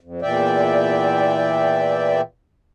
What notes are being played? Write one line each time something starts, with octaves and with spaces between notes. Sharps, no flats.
F2
E2 A#2 E3 D5 E5 G5